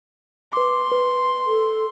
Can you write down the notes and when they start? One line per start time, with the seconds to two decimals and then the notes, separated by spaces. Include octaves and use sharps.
0.53 B4 C6 D6
0.92 B4
1.46 A4